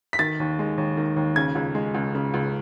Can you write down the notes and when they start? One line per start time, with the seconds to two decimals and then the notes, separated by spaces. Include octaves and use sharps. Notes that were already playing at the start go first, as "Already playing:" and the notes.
0.13 B6
0.19 D#3 A6
0.40 D#2
0.59 G#3
0.78 D#2
0.97 D#3
1.16 D#2
1.36 C#3 G#6
1.55 C#2
1.75 G#3
1.94 C#2
2.15 C#3
2.34 C#2